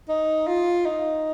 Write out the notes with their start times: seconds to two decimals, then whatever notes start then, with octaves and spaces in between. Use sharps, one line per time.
0.09 D#4
0.47 F4
0.86 D#4